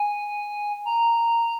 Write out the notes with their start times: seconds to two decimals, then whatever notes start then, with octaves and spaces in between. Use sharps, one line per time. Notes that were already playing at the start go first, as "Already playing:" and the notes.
Already playing: G#5
0.86 A#5